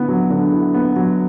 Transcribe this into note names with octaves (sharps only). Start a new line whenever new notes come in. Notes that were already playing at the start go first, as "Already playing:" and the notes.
Already playing: D3 B3 E4
F#3
D3
E4
B3
F#3